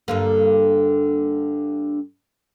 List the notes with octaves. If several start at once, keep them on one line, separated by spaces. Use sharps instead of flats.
G2 D3 A#3